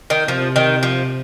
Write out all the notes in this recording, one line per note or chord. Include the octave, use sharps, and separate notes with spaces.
D#3
C3 F3
D#3
F3